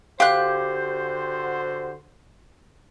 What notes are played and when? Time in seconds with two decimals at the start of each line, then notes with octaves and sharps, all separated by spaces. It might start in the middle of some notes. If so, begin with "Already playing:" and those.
0.20 D3 F#4 G4 C5 F5 F#6